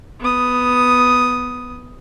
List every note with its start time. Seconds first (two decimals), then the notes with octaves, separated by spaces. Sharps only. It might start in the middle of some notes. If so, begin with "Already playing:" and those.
0.20 B3 D#6